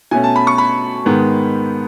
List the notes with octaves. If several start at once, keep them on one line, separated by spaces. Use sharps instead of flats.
B2 A3 C#4 G#5
A5
B5
C#6
B5
G#2 D#3 G#3 B3